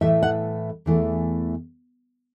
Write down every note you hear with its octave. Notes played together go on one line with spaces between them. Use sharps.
A2 E3 A3 E5
F#5
E2 E3 A3